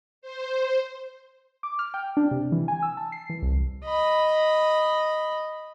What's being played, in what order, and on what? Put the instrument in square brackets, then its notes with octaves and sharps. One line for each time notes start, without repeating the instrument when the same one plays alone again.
[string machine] C5
[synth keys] D6
F6
G5
D4
C3
E3
G#5
E6
A5
C7
E3
C2
[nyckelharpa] D#5 B5